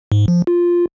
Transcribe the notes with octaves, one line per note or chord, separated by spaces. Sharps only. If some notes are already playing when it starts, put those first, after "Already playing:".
G#2
F3
F4